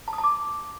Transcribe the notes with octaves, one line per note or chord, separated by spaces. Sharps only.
A5
D#6
A5
D6